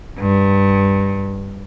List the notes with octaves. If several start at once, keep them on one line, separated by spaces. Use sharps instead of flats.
G2